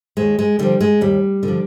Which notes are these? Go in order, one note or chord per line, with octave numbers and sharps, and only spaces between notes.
D#2 G#3
G#3
D3 F3 G3
G#3
D#2 G3
D3
F3